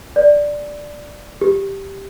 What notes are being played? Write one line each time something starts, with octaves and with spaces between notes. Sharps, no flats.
D5
G4